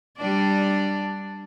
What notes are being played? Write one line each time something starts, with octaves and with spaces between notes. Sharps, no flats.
G3 D4 D5